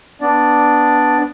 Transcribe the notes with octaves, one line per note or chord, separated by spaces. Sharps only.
B3 D4 D5